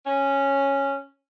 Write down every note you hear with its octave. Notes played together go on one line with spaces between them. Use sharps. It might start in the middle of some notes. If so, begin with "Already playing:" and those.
C#4